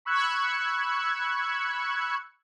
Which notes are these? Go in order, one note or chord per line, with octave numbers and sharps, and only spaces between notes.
B5 C#6 E6 F#6 G#6 C#7